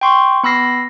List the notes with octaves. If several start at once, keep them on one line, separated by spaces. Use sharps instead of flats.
G5 C6 C#6
B3 B5 E6 A#6 C7